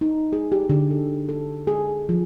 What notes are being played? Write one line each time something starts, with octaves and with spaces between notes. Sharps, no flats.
D#4
G#4
G4
D3
A4
A4
G#4
F3